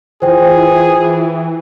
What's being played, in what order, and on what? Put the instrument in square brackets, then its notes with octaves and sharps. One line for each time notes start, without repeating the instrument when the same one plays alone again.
[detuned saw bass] E3 [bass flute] F4 [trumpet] G#4 [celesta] C5 G5